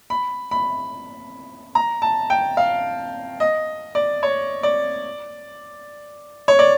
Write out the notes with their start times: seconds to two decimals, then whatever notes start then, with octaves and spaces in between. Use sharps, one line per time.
0.10 B5
0.51 B5
1.75 A#5
2.02 A5
2.30 G5
2.57 F5
3.40 D#5
3.95 D5
4.23 C#5
4.63 D5
6.48 C#5
6.59 D5